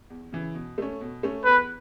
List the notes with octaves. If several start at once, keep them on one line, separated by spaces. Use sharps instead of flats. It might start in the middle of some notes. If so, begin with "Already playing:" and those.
E2
C#3 E3
B2
A3 C#4
B2
A3 C#4
E2 B4